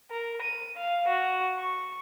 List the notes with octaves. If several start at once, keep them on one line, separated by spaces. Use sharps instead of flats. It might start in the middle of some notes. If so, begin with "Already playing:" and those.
A#4
D#7
F5
F#4
C#6